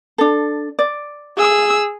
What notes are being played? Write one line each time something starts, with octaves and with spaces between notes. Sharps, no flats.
D4 A4
D5
G#4 E6